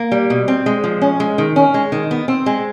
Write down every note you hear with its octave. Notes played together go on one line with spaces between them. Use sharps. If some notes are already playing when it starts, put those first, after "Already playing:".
Already playing: A#3
G3
B2
C4
G#3
F3
C#4
G#3
D#3
C#4
G#3
D#3
B3
C4
G#3